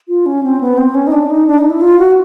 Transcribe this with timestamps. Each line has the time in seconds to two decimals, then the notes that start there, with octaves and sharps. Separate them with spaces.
0.08 F4
0.26 C#4
0.43 C4
0.61 B3
0.78 C4
0.94 C#4
1.07 D#4
1.12 D4
1.30 D#4
1.47 D4
1.58 D#4
1.70 E4
1.81 F4
1.99 F#4